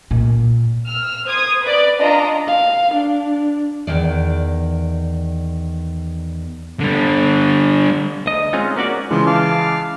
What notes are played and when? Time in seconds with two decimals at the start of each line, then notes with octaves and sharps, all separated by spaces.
0.11 A#2
0.86 E6 F6
1.25 C5 D#6 G#6
1.62 B4 D5
1.99 D4 F4 D#5 A#5
2.48 F5
2.94 D4
3.87 E2 D#3 D5
6.80 D3 G3
8.26 D2 D#5
8.53 G#3 C4 C#4 D#4 F4
8.76 A#3 C#4 F#4 D5
9.11 C#3 E3 F3 G#3
9.27 F5 A5 D6